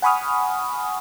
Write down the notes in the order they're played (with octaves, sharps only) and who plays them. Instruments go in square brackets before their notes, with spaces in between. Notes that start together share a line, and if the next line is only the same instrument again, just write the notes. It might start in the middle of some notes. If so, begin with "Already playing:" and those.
[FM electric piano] F#5 G#5 B5 C#6 D#6 F6